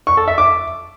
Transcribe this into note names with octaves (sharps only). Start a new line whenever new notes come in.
C#6
A4
E5
D6